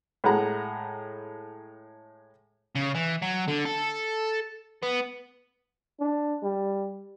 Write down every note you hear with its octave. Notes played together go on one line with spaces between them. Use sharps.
A2 G#3 F#5 A#5
C#3
E3
F#3
D3
A4
B3
D4
G3